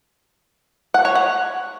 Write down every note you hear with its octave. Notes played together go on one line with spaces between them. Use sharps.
F#5
C#5
F#5